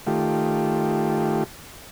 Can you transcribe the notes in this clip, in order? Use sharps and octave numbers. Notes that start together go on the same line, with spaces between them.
D#3 A3 F4 G4